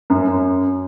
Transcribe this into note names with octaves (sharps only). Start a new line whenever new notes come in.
F#2
F#2